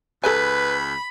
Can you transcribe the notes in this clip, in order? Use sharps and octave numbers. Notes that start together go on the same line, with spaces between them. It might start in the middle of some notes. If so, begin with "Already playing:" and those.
C#2 A4 B4 G#5 B5